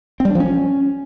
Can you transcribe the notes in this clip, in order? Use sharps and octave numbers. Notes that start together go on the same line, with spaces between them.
C4
G3
D4
F3
C#4